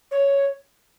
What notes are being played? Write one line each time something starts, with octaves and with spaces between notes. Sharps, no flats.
C#5